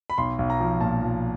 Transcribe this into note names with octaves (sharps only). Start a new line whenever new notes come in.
B5
B1 C6
B1
A#5
F3
A#2 A5
F3